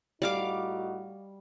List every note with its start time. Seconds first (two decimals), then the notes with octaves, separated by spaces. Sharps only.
0.22 A2 G3 D#4 F#4 F5 D6